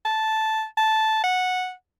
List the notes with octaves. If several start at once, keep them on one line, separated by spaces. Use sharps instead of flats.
A5
A5
F#5